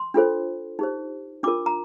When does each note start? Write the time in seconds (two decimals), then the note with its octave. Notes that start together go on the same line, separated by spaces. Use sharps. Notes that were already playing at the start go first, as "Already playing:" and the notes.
Already playing: C6
0.14 D4 F4 A4 C5
0.79 D#4 G4 C5
1.43 D4 F4 A#4 D6
1.66 A#5